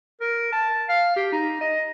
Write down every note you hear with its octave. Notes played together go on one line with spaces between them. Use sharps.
A#4
A5
F5
G4
D#4
D#5